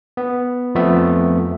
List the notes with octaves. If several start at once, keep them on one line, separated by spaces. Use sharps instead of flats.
B3
F2 F3 A3 B3 E5